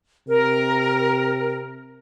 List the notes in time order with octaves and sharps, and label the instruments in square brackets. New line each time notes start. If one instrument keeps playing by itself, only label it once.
[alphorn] C3 [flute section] A#4